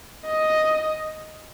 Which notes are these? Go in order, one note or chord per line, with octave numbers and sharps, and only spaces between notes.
D#5